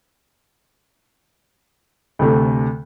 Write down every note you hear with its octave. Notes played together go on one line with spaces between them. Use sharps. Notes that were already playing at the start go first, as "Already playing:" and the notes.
D2 C3 A3